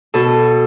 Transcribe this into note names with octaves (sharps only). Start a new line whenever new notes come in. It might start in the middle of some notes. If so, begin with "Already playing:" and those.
B2 A4